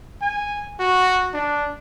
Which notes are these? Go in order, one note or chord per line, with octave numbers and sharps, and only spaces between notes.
G#5
F#4
D4